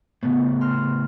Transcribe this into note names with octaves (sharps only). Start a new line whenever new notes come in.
A2 C#3 B3
C6 F6